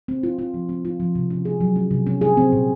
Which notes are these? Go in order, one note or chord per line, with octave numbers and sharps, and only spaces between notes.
C4
F4
F4
F3
C4
F4
F3
C3
C#4
G#4
F#3
C#4
C3
C#4
G#4
C4
A#2